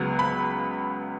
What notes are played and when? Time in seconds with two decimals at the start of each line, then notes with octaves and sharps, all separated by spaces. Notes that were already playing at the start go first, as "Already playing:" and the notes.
Already playing: C#2 C#3 F#3 B3
0.19 B5